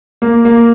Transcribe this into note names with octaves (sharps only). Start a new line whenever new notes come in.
A#3
A#3